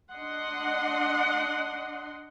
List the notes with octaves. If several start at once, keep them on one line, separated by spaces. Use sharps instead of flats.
D4 D#5 F#5 C6